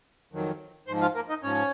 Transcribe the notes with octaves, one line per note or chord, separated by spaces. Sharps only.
F2 D#3 F#3
G#2 F3 C5 C6
F4 F5
A#3 A#4
D#4 D#5
G#2 F3 C#4 C#5